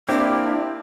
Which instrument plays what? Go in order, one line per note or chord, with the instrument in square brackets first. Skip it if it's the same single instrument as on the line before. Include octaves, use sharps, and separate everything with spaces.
[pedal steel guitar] A#3 E4 G4 [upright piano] C4 [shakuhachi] D4